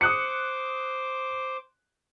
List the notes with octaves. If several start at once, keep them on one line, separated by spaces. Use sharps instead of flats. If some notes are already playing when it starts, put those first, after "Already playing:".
C5 D6 D#6 F#6 C#7